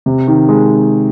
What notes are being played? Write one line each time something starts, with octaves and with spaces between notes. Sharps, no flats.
C3
D#3
G#3